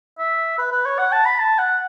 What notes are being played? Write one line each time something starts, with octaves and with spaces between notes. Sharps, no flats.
E5
B4
B4
C#5
F#5
A5
B5
A5
F#5